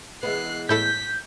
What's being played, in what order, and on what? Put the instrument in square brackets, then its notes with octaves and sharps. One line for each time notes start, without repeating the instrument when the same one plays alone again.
[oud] E3 G#3 B3 [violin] F#6 C7
[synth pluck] A2 E4 A4 [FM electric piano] G6 [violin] B6